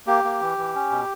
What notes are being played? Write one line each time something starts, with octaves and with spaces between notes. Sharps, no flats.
A#3 G4
A#3
E3
E3
C#4
B2